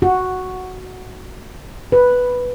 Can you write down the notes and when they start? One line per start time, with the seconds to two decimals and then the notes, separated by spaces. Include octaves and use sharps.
0.02 F#4
1.92 B4